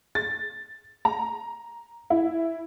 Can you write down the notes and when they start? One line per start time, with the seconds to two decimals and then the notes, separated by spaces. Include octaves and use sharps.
0.15 A6
1.05 A#5
2.10 E4